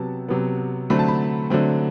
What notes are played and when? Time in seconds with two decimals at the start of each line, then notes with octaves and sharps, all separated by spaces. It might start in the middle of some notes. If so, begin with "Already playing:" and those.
Already playing: C3 F#3 B3 A5
0.29 C3 F#3 B3
0.90 D3 F#3 A3 C4 B5
0.99 A5
1.08 B5
1.50 D3 F#3 A3 C4